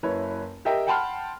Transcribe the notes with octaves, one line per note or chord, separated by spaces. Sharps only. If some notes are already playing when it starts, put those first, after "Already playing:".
F#1 E4 B4 C#5
G4 A#4 D#5 E5 G5
F#5 G5 A5 B5 C6 F6